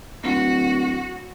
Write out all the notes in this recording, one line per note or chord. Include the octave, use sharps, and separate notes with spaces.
D1 F#4